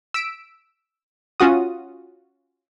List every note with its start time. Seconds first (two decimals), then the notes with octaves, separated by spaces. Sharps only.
0.14 E6 B6 D7
1.40 C#4 F4 F#4 D#6